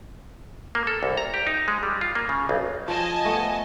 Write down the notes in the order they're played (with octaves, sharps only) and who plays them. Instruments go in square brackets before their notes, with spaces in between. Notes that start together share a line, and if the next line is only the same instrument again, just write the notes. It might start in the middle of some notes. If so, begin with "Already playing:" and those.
[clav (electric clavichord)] A#3
A4
C2
A#5
G4
D#4
G#3
G3
F4
A#3
C#3
B1
[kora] F3 [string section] D#5 G#5 A5
[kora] A3 B3